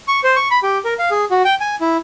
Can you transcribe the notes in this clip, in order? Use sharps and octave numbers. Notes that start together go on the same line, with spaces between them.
C#6
C5
C#6
B5
G4
A#4
F5
G#4
F#4
G5
G#5
E4